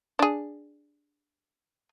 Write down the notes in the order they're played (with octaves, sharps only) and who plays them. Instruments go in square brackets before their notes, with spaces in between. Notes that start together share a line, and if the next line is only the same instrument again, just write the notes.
[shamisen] D4 G#4